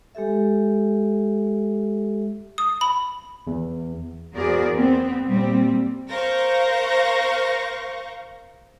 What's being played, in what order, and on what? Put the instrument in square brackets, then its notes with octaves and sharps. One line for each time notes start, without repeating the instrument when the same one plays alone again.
[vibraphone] G#3 G4 A4 E5
[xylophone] D#6
B5
[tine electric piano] E2
[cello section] E2 F#4 G#4 A#4 C5 D5
B3 C4
A#2 G3 C4
[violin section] A#4 C5 F5 C#6 G6 A#6